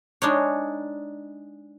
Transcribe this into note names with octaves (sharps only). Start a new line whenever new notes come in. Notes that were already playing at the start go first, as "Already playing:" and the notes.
G#3 D4 D#4 C#5